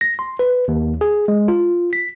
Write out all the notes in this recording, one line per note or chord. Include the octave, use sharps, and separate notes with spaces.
A#6
C6
B4
D#2
G#4
G#3
F4
B6